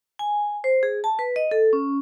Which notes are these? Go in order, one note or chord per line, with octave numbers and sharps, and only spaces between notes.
G#5
C5
G#4
A5
B4
D#5
A4
C#4